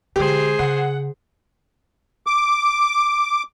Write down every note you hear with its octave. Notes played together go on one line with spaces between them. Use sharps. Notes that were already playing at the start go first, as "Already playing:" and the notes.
D3 G#3 G4 G#4 C5
C#3 F#5
D6